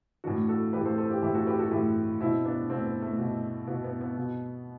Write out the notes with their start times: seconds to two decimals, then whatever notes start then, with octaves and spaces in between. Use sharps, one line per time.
0.24 A2 E3 D4 F#4
0.48 F#4 A4
0.73 A2 E3 G4 B4
0.85 A4 C5
0.98 A4 C5
1.10 G4 B4
1.22 A2 E3 E4 G4
1.35 F#4 A4
1.47 G4 B4
1.59 F#4 A4
1.71 A2 E3 E4 G4
2.20 B2 C4 E4
2.45 B3 D4
2.69 B2 A3 C4
2.86 B3
3.02 A3
3.19 B2
3.67 B2 B3
3.84 B3
4.01 B3
4.17 B2